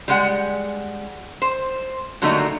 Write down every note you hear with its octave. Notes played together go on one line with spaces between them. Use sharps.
G3 G#3 F#5
C5
D3 F#3 G3 A3 A#3 D#4